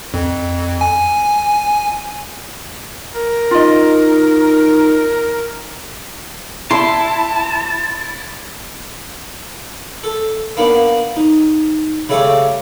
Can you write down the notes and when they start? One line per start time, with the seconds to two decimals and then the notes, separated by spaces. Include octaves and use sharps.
0.14 F2
0.81 G#5
3.14 A#4
3.51 D#4 F4 D#5
6.71 E4 A5 C6
10.04 A4
10.57 A#3 B3 D4
11.16 D#4
12.09 C#3 G3 A3 C#5 E5 D6